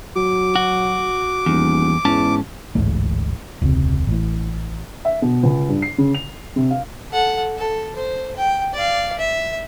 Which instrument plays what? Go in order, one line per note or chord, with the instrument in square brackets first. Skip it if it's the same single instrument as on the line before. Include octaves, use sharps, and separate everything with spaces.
[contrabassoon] F#3 [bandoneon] D6
[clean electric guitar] F#4
[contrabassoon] D#1 [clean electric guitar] E2
[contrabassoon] E2 [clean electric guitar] G#2 C#4 A5
[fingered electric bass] D1 A1 G#2 A3
E1 C#2 C3
A1 A2
[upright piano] E5
B2
C#2
G2
C7
C#3
F7
C3
F5
[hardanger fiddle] A4 F#5
A4
C5
G5
D5 F5
E5